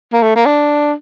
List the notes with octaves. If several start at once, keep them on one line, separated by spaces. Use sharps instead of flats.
A#3
A3
A#3
D4